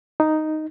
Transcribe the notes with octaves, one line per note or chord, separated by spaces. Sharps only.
D#4